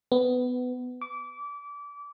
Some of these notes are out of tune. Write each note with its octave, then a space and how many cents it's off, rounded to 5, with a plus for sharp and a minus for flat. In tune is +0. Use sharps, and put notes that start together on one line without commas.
B3 +20
D6 -25